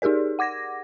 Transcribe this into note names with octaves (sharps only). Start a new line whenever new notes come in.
D#4 G4 G#4 A#4 D5
F#5 D6 G#6 A#6